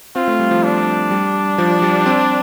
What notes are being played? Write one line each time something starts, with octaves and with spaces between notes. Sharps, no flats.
C4 F4
A3
G3
F3
D4
G3
F3
G3
C4